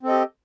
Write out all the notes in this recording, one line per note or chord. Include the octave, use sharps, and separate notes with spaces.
C4 G4 A4 D#5